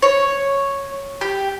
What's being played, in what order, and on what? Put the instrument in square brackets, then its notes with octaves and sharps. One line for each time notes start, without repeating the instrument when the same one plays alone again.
[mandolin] C#5
G4